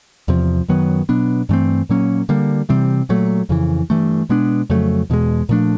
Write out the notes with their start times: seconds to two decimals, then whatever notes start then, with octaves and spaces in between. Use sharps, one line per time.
0.28 E2 C3 F3
0.69 F#2 D#3 F#3 B3
1.09 B2 F#3 B3 D4
1.49 G2 E3 A3 C4
1.89 A#2 F#3 A#3 C#4
2.29 D3 G3 A#3
2.69 C3 E3 G3 C4
3.09 A#2 F#3 A3
3.49 F2 C#3 E3
3.90 G2 E3 A3
4.30 B2 G#3 B3 D4
4.70 F2 C#3 F#3 A3
5.10 E2 B2 G#3
5.49 A#2 F3 A3 D4